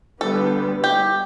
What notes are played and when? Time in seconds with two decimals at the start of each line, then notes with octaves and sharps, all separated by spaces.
0.20 D3 G3 B3 A4
0.84 G4